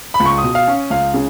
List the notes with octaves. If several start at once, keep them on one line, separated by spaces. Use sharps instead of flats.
B5
C#2
C#6
D#6
B2
F5
C#4
C#2 F5
C#3